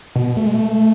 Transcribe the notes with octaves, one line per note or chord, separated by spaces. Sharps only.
B2
A3
G#3
A3